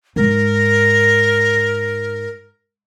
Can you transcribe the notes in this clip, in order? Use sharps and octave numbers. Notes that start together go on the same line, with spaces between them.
G#2 A#4